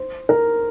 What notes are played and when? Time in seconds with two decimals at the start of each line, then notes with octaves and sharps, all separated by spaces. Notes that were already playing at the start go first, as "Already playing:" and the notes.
Already playing: C5
0.29 A#4